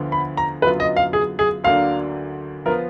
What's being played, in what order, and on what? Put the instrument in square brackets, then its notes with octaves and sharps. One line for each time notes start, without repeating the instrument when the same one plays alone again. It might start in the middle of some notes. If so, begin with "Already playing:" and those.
Already playing: [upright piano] D2 D3 F3 B3 F4
[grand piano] B5
A#5
[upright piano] F#2 D3 F#3 B3 F4 [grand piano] B4
[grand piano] D#5
F5
G#4
G#4
[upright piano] D2 D3 F#3 A#3 D4 [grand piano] F5
[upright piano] F3 B3 F4 [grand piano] A#4